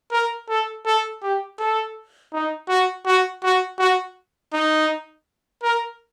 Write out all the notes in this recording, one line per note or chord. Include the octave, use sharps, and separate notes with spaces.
A#4
A4
A4
G4
A4
D#4
F#4
F#4
F#4
F#4
D#4
A#4